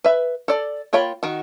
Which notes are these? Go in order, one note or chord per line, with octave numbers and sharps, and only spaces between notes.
B4 E5
A4 D5
A#3 F4 C#5 G5 B5
D#3 F#4